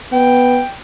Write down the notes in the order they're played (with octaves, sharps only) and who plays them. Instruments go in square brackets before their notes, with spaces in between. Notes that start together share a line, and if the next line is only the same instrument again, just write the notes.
[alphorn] B3 [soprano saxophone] G5